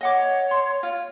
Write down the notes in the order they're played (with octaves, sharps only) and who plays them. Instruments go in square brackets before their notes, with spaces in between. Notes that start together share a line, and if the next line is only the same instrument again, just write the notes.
[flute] C#5 [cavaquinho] D#5 F#5 D6
[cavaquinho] C6
F4